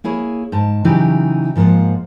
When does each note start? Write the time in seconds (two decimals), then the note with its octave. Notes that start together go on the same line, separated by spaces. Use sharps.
0.04 A#3 E4 G#4 C#5
0.52 G#2 A5
0.84 C#3 E3 F#3 D#4 E4 G4
1.56 G#2 F3 A#3 F4 F#5